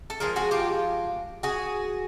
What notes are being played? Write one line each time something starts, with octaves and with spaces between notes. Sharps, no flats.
A4
D3 F3 G#3 G#4 A#4
F#4 G#4
F4 G4
F#4 G#4